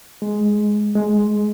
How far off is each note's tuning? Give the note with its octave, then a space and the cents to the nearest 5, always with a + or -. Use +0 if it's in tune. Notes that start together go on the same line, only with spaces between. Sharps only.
G#3 +10
G#3 +15